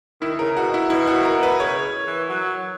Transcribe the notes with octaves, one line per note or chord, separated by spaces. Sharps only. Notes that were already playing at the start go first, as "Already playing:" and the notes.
D#3 E4
C#3 A#4
B2 F#4
E4
B2 E4
F#4
A#4
B4
C#3 C#5
E3
F#3